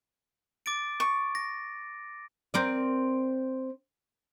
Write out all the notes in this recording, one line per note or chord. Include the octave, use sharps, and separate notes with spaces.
D6 A6 D7
C#6
A#6
C4 A#4 D5